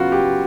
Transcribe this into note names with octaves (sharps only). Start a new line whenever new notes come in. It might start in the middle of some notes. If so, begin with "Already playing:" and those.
Already playing: C#3 F#3 B3 F4 F#4
G4